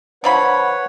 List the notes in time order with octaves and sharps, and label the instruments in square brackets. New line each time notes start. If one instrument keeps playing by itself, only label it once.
[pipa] D3 F3 B5 [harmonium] B4 C#5 F#5